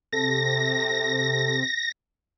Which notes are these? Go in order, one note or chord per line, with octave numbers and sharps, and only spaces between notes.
C3 A4 A#6